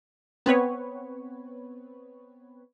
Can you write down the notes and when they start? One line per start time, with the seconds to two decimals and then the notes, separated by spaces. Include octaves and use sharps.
0.46 B3 C4 B4 C#5